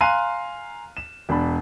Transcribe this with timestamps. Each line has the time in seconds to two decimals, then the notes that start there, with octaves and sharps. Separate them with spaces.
0.01 F5 G#5 A#5 C6 F#6 D#7
0.97 E7
1.29 E1 D4 B5